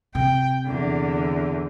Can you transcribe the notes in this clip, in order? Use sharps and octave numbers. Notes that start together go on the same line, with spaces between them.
C3 G5
E2 D3